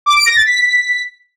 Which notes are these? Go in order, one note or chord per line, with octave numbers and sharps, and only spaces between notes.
D6
D7
A#6
A6
B6